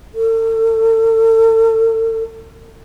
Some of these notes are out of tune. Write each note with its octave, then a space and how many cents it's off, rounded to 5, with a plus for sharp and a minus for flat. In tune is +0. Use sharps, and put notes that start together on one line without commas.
A4 +40